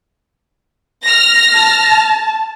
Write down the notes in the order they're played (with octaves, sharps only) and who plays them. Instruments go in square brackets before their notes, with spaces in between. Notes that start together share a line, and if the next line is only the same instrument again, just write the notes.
[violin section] F6 A#6
[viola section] A5